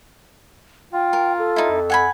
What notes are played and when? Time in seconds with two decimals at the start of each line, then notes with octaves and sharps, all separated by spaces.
0.93 F4 G5
1.13 A#4
1.38 A4
1.56 D#4 E4
1.71 F2
1.90 F#5 G#5 B5